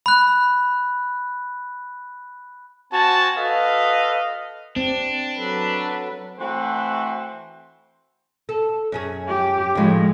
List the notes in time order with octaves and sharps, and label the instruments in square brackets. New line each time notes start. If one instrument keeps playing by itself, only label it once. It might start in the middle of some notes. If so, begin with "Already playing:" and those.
[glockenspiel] B5 F#6
[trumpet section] C4 F#4 G#5 A5
F#4 A4 B4 D#5 F5
[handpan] C4 [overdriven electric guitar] D4
[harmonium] F#3 A4 [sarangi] B4
[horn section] E3 A3 C4 F#4 C5
[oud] A4
F#2 C#4 G#4
[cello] G4
[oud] D#2 A2 [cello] F3 G#3